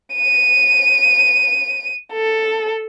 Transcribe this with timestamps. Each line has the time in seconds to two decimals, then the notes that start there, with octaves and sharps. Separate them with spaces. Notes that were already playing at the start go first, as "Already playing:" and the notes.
0.16 D#7
2.13 A4